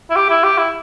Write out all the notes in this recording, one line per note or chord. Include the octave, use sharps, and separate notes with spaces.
E4
G4
E4
G4
E4